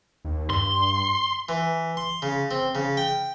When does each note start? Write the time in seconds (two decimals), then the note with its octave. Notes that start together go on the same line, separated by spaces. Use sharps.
0.25 D#2
0.50 G2 C6
1.49 E3
1.97 C6
2.22 C#3
2.51 C4
2.75 C#3
2.97 G5